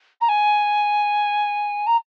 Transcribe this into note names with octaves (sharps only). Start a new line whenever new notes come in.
A#5
G#5
A#5